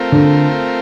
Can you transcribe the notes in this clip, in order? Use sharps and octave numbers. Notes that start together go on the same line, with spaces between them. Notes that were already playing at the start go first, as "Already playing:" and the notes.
Already playing: A3 C4 F4 A#4
D3